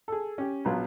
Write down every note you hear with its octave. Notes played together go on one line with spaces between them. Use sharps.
G#4 A4
C#4 G4
A#1 F#3 B3 F4